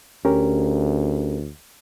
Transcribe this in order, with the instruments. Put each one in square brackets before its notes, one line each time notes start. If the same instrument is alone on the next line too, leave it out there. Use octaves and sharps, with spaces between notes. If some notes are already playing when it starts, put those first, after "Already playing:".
[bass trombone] D2 [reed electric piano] C#4 G4 A#4